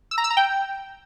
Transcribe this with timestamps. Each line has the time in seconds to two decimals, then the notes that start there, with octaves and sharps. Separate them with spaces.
0.11 E6
0.18 A#5
0.24 E6
0.30 A#5
0.37 G5